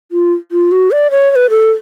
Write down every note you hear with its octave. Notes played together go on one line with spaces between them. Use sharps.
F4
F4
F#4
D5
C#5
C#5
B4
A4